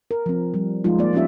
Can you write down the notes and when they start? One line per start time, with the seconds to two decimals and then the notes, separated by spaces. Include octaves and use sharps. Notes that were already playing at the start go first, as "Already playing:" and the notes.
0.11 A#4
0.26 F3 C4
0.54 F3 G3
0.84 F3 G#3 D#4 F4
0.99 A#3 D5
1.13 F3 C#4 D#4 F4 G4 E5